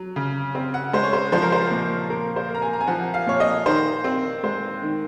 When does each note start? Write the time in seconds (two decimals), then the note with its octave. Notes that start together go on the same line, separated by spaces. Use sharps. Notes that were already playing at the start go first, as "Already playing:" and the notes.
Already playing: F#3
0.16 C#3
0.55 C4
0.74 F#5
0.93 G#3 C5
1.03 C#5
1.13 C5
1.32 F3 C5
1.42 A#4
1.52 C5
1.71 A#2
2.10 A#2 A#4
2.36 C5
2.49 A#3
2.55 A#5
2.62 G#5
2.73 A#5
2.81 G#5
2.87 F3 F#5
3.14 F5
3.27 A#2 C#5
3.40 D#5
3.66 D#3 C5
4.04 C4
4.43 G#3 C5
4.83 D#3